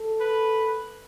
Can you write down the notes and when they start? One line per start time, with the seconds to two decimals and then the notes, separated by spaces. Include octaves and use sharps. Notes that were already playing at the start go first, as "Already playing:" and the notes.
Already playing: A4
0.21 B4